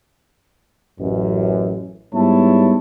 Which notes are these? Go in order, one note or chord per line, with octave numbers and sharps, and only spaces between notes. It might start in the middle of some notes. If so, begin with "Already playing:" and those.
A1 F#2
G#2 G3 B3 E4 C#5 A5